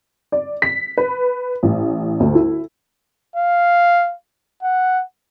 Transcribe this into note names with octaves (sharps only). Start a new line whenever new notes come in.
D5
B6
B4
A1
D2
E4
F5
F#5